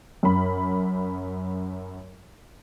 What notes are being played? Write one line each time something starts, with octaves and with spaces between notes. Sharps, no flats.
F#2 B5